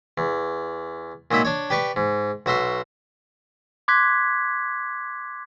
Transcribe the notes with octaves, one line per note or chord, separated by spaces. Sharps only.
E2
A#2 F#3 D#4 E5 B5
D4 C#5
G4 B4 D5 C#6
G#2
B1 F#4 E5 C6
C6 D6 F#6 G#6 B6